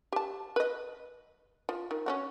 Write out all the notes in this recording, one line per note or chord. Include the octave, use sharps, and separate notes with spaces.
G4 A5
B4 D#5
F3
D#3
C#4 D4 F#4